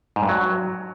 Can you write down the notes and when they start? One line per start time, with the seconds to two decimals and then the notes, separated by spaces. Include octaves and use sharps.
0.16 G#2
0.23 G2
0.29 F#3